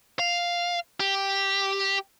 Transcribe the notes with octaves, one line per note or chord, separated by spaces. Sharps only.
F5
G4